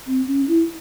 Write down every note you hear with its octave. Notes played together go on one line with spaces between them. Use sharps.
C4
C#4
E4